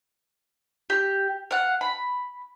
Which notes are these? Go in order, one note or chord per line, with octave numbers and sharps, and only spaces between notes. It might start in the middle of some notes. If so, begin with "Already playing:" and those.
G4
F5 F#5
B5